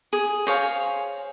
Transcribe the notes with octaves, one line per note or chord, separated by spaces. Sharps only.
G#4
C5 C#5 F5 G#5